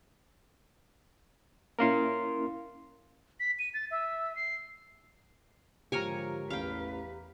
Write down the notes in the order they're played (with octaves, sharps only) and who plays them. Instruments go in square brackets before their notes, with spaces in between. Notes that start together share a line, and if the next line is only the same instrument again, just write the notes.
[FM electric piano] A#3 C#4 E4 [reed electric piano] A#4 F5 C6
[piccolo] B6
D#7
A6
E5
C7
[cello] G#2 D3 [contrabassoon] F3 [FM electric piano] G4 A#5 [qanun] A#4 C#5 G#5
[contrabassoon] A1 [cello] E2 B4 [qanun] F5 G5